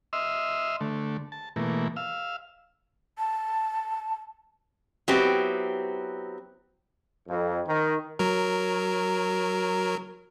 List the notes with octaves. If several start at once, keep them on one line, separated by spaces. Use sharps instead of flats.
D#5 E5 C6 E6 F6
D3 A3
A5
B2 E3 A3 A#3
F5 E6
A5
F#3 B3 C4 E4 G4
F2
D#3
F#3 A#4